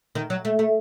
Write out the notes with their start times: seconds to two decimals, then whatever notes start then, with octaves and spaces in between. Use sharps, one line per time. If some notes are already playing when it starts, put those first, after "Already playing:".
0.15 D#3
0.30 F#3
0.45 A3
0.59 A3